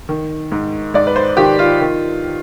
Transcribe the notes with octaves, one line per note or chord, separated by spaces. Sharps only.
D#3
G#2
G#2 D5
B4
C5
D#3 G4
F4
D#3